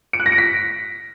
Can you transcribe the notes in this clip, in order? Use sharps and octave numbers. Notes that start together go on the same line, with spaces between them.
D7
F#6
A#6
D7
B6